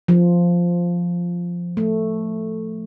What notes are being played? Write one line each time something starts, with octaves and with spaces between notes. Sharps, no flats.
F3
A3